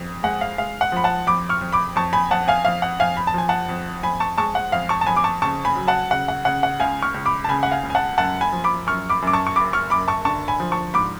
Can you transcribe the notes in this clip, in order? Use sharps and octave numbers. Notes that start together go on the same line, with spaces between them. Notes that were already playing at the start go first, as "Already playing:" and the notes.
Already playing: F2
G#3 F#5
F5
G#3 F5
F#5
F3 B5
F#5 A5
F2 B5 D6
C#6 F6
F2
B5 D6
F2 A5 C#6
G#5 B5
F2 F#5 A5
F5 G#5
F2 F5
F#5
F2 F5 G#5
B5
A5
F3 G#5
F#5 A5
F2
F2 G#5 B5
A5 C#6
G#3 A5 C#6
F#5
F2 F5
A5 C#6
A5
F2 G#5 B5
D6
A5 C#6
C#3 A5 C#6
G#5 B5
F#3
F#5 A5
C#3 F#5
F#5
C#3 F#5
F#5
C#2 F5 G#5
C#6 F6
C#2
B5 D6
A5
C#3 G#5 B5
F#5
F5 G#5
C#2
G#5
F#5 A5
F#2 F#5 A5
G#5 B5
F3
B5 D6
F#2 C#6 F6
B5 D6
F#2
D6
A5 C#6
C#6
F#1 B5 D6
C#6 F6
F#2 B5 D6
A5 C#6
D3 A5 C#6
G#5 B5
F3
A5 C#6
G#2 B5 D6